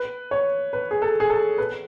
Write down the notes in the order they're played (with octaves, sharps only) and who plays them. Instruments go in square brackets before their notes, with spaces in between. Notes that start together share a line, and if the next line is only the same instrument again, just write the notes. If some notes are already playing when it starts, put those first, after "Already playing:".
Already playing: [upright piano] B4
C#5
B4
G#4
A4
G#4
A4
B4